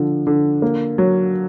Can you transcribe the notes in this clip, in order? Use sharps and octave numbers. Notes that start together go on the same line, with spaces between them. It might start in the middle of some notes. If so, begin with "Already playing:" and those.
Already playing: D3 F3
D3
A#3
F#3